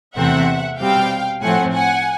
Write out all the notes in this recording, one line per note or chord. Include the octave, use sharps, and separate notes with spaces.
E2 C3 E3 A3 C4 E5 F#5
B2 G3 C4 F5 G5
A2 F3 A3 C4 F#5 G#5
F#5 G#5